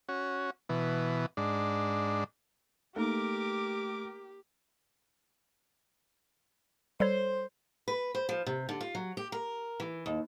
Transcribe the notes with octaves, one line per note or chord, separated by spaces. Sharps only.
C#4 F#4
B2 E3
G#2 D4
A3 A#3 D#4 G4 A#4 D6
G3 A4 C5 C#5
B4
C5
F3
C3
D3
F4
F#3
G4
A#4
E3
D#2